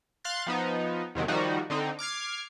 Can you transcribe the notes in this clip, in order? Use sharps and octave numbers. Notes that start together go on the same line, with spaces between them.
F5 C6 F#6 A6
F3 B3 D#4
E2 C3 D#3 F#3
D#3 F3 G3 D#4 F#4
D3 C4 D#4
D6 F6 G#6 C7